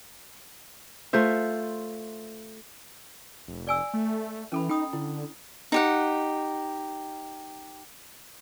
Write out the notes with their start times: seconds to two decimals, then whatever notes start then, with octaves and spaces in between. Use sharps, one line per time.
1.13 A3 F4 C5 E5
3.48 F1
3.67 D5 G#5 E6
3.94 A3
4.52 E3 C#4 A4 B5
4.69 D#4 G5 B5 D#6
4.93 D3 E4
5.72 D#4 G4 F#5